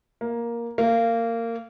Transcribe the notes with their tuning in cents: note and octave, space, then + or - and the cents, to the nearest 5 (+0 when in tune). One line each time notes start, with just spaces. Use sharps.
A#3 +10
A#3 -20